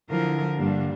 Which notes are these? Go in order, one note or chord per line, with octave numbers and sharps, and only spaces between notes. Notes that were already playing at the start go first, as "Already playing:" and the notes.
D3 E3 F3 A#4
G2 G3 A#3 D4